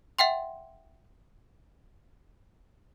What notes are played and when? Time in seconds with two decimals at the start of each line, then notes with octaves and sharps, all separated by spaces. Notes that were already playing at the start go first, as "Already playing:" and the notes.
0.19 E5 F#5 G5 C6